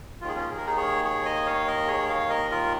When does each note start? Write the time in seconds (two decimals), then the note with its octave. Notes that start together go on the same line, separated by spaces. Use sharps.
0.21 D#2 D#3 F4
0.28 G#4
0.35 C#4 F4
0.49 G#4
0.57 A#4
0.66 D#4 G#4
0.77 G#4 C#5
1.05 G#4 C#5
1.25 D#5 G#5
1.46 C#5 F5
1.67 A#4 D#5
1.88 G#4 C#5
2.09 C#5 F5
2.30 A#4 D#5
2.51 F4 A#4